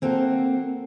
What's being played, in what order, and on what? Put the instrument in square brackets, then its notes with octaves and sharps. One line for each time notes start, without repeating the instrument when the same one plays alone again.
[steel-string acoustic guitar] A#3 C4 F#4 A4